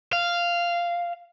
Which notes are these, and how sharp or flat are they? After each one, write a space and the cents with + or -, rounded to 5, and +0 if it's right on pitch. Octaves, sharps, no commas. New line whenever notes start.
F5 -10